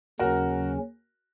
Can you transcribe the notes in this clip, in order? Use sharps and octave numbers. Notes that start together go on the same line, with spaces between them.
D#2 C#3 F#3 C#4 F#4 A#4